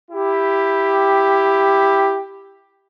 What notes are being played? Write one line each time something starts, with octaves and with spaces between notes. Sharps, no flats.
E4 G4